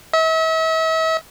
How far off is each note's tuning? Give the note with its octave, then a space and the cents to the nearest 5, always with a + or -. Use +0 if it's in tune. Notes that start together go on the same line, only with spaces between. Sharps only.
E5 -40